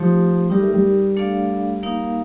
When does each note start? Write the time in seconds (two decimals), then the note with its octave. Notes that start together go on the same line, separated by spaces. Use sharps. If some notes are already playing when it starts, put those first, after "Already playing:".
Already playing: F3 A3 D#4 G4
0.50 G3 D#4 G4 A#4
0.62 A3
0.74 G3
1.16 A3 D4 A4 D5 F5
1.83 A#3 D#4 A#4 F5